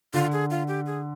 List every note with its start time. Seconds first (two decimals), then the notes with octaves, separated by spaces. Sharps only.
0.13 D3 F4
0.32 G#4
0.50 F4
0.68 G4
0.86 G#4